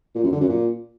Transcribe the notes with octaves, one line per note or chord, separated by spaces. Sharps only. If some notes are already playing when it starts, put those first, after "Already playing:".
A#2
F#2
D3
F#2
A#2